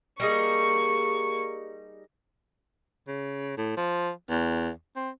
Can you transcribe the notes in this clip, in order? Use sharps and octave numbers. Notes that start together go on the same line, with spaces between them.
G3 A#3 D#4 G#4 C#6
C#3
A2
F3
E2
C4